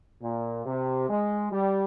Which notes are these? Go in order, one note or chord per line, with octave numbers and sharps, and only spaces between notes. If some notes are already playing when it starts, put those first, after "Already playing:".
A#2
C3
G#3
G3